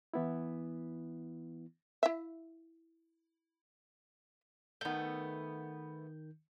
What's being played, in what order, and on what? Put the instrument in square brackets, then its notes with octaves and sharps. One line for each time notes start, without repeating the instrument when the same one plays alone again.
[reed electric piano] E3 B3 E4
[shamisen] E4 E5
[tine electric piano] D#3 G6 [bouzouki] A3 B3